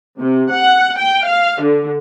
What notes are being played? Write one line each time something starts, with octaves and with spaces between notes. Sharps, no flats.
C3
F#5
G5
F5
D3